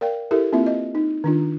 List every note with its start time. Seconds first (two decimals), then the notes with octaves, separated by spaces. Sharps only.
0.01 A#4 D5 F5 G5
0.31 E4 G4 A4 A#4 E5
0.52 A#3 C4 E4 F4 E5
0.67 D#5
0.95 D#4
1.24 D#3 D4 F4